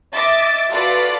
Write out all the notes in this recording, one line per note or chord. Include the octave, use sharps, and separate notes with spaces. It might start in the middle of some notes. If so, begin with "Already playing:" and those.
D#5 E5 D6 A6
F4 F#4 A4 B4 D5